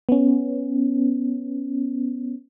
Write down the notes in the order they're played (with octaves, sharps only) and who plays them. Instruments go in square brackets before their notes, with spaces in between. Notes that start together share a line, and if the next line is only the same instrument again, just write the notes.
[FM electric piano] B3 C#4